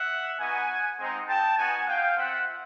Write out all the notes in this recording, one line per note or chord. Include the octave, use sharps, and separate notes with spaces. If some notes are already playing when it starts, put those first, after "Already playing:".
Already playing: E5 F#5
B3 D#4 F#4 F#5 G#5
G#3 C4 D#4
G5 A5
B3 D#4 F#4 F#5 G#5
F5 G5
C4 F4 E5 F#5